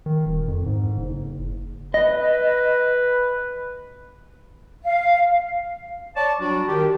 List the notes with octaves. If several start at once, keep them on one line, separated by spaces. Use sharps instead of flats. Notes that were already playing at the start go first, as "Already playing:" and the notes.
D#3
D#1
F2
G#2
F#1
B4 D#5
F5
C#5 D5 A5
F#3 G3 D4 F#4
D#3 G4